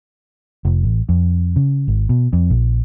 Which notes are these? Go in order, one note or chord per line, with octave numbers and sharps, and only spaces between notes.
F1
A1
F2
C#3
G#1
B2
F2
A#1